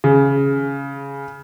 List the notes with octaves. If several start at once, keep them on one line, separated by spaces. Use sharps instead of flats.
C#3